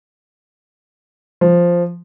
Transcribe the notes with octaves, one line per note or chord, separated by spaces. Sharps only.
F3